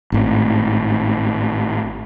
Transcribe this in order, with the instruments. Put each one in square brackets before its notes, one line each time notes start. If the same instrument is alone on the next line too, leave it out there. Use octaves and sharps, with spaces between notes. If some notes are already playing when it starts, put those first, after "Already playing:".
[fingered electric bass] G#1 A2